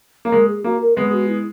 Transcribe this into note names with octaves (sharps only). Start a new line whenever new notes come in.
A#3
G#3 A#4
G#4
A#3 F#4
A#4
G#3 B3 G#4
F#4
E4